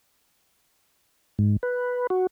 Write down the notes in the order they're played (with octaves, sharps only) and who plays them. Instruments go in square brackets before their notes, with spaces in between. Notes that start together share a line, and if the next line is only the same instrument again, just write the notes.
[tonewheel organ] G#2
B4
F#4